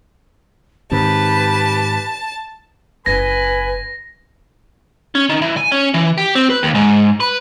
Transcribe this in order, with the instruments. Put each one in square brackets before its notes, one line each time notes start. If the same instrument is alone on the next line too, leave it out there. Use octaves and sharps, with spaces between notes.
[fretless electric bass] G#2 D#3 C4 [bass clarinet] G4 [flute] B4 [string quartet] A5
[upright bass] F#1 E4 [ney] B4 [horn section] G#5 B5 [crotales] A#6
[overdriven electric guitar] C#4
D#3
E3
G#5
C#4
E3
G4
C4
B4
D#2
G#2
B4